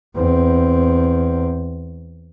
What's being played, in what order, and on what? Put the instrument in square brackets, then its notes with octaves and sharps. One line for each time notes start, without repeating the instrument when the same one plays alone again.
[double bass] E2 C4